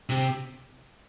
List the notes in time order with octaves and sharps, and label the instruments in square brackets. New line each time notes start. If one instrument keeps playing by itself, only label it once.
[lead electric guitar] C3